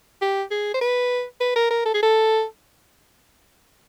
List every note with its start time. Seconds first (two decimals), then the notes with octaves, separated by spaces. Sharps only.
0.22 G4
0.51 G#4
0.74 C5
0.81 B4
1.41 B4
1.56 A#4
1.71 A#4
1.86 A4
1.94 G#4
2.03 A4